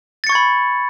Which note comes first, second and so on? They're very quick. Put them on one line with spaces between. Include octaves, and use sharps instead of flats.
A6 C#7 C#6 G#6 B5